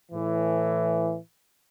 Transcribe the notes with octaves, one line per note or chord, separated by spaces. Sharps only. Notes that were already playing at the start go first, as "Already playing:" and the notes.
A2 E3